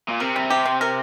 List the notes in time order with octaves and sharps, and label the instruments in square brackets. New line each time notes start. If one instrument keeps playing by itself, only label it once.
[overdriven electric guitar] A#2
[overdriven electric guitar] C3 [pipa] A#4
[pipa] G3
G4
C4
A#4